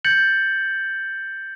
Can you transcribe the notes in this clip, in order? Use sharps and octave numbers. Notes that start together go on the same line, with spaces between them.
G6 A6 C#7 F#7